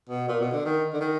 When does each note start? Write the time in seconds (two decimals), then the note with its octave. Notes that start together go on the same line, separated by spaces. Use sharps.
0.09 B2
0.28 A#2
0.41 B2
0.52 D3
0.65 D#3
0.93 D3
1.01 D#3